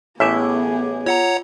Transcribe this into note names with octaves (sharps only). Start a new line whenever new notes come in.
A1 A2 B3 G#4 C#5 E5 G#5 D6
F4 C#5 F#5 A#5